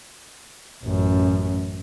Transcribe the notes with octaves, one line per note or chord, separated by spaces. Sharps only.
A1 F#2